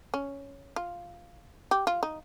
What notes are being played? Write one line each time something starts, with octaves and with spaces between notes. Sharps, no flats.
C#4
F4
G4
F4
D#4